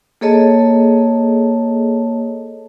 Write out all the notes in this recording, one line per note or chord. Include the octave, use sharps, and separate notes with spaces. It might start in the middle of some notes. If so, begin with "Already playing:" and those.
A#3 G#4 A4 C#5 D#5 A5